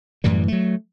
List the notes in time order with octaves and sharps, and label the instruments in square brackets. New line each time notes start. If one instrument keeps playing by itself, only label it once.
[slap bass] F#2 A2 E3 G3
F#3 A3